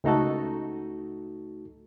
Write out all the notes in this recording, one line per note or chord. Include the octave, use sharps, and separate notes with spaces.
C#2 A3 D#4 F#4 A4